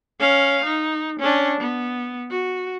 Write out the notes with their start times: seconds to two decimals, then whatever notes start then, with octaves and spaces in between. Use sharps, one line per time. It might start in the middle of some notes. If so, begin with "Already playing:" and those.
0.20 C#4 F5
0.65 D#4
1.19 C#4 D4
1.61 B3
2.31 F#4